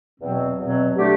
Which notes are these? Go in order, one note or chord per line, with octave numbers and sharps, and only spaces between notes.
E2 B2 F#3 C4
E2 B2 F#3 C4
D3 A3 D4 G4